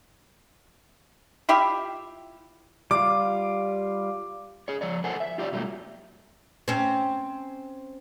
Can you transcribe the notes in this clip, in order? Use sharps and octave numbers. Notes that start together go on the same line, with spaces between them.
E4 F4 G4 E5
G3 F4 D6
G#4 C#5
F3 C#5 D5
A4 A#4 C5 F#5 G#5
E5
F4 G4 C#5 D5
B2 F#3 G3 A3 A#3
C4 C#4